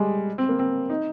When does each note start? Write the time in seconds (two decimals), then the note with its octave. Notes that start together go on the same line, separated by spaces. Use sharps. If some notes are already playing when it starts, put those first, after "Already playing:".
Already playing: G3 G#3
0.38 C4
0.49 A#3
0.59 C4
0.90 D#4